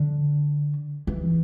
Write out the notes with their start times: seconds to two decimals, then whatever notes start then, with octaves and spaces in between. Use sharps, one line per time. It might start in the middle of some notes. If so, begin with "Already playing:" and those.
Already playing: D3
1.07 E3